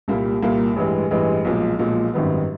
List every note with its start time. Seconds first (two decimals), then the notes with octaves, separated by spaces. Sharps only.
0.08 C2 A#2 G3 A#3
0.42 C2 A#2 G3 A#3
0.76 A1 G2 E3 G#3
1.11 A1 G2 E3 G#3
1.45 B1 A#2 F3 G#3
1.79 B1 A#2 F3 G#3
2.13 G#1 F#2 D#3 G3 B3